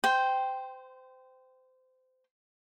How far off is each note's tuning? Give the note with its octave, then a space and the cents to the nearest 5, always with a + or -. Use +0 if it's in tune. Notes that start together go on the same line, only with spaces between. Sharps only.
C5 -25 G5 +0 C6 +0